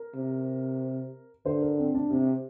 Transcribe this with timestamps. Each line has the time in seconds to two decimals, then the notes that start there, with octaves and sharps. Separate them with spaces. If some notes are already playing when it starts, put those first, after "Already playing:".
Already playing: A#4
0.15 C3
1.46 D3 C5
1.62 A#4
1.78 C4
1.95 D4
2.10 C3 C4